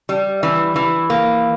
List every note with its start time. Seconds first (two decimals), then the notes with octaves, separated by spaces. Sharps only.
0.09 G3
0.43 E3
0.76 E3
1.10 A#3